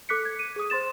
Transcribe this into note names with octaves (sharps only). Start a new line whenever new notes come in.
A4 D6 F#6 B6 C#7
G#6
D#7
G#4 D#6
C5 C6 A6 E7